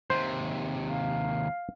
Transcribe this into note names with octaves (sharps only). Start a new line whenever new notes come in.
D#2 C3 C5
F5